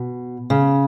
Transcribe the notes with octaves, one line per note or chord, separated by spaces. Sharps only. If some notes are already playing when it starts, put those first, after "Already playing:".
Already playing: B2
C#3